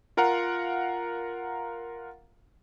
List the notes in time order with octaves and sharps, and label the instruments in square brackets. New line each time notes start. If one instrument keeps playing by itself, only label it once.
[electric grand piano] F4 A#4 F5 F#5 A#5